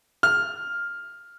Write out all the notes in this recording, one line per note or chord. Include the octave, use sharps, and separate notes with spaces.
F6